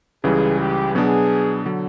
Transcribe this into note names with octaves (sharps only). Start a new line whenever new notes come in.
C#2 C#3 E3 G3 G#4
G4
B2 F#3 B3 D4 G#4
D3 F#3